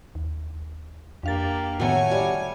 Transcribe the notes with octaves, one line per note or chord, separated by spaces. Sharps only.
D#2
F2 A#3 D4 G4 F5 A6
A2 D#3 F#3 A3 B3 C#5 F#5 G#5
G3